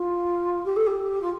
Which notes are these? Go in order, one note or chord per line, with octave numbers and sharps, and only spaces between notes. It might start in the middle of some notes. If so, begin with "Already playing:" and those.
Already playing: F4
G4
A4
G4
F4